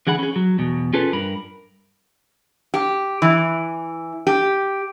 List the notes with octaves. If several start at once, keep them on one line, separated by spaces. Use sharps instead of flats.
D3 E3 G#4 F#5 B5
C#4 G#4
F#3
E2 B2
C#4 F4 G#4 A4 B4 C#5
G2 A#4 B5
G4
E3
G4